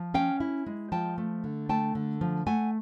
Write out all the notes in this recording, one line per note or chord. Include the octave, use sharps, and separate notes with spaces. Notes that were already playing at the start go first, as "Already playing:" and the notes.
Already playing: F3
C#4 F5 G5
E4
G#3
F3 G5 A5
A3
D3
A3 G5 A5
D3
F3
A3 F#5 G#5